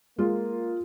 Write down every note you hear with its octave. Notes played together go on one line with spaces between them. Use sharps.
G#3 A#3 F4